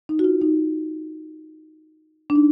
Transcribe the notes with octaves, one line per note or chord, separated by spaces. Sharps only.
D#4
F#4
F4
D#4
D4
D#4